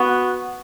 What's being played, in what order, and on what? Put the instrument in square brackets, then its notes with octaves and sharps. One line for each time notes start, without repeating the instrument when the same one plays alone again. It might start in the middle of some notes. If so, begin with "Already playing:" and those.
Already playing: [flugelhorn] B3 [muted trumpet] F#4